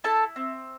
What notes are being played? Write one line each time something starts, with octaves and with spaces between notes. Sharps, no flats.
E4 A4 A5
C4